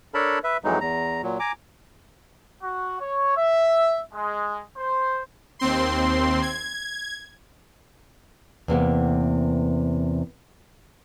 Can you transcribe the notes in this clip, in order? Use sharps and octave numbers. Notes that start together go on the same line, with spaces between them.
D4 A4 A#4 C#5 A5 B5
B4 E5
F2 E3 F#3 G#3 D#4
E2 A#5
A#2 F#3
G#5 A#5 D6
F#4
C#5
E5
G#3
C5
D#2 C4 C6
G#6
E2 C3 A#3 B3